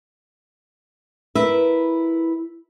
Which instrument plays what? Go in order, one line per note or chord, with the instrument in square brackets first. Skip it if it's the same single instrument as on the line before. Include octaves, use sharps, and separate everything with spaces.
[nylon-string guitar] E4 A#4 B4 E5